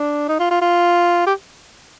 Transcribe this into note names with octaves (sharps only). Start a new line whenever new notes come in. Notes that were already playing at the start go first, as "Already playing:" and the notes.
Already playing: D4
D#4
F4
F4
F4
G4